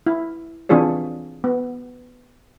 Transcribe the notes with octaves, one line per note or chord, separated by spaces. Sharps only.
E4
E3 C4 D4 F4 G#4 C#5
B3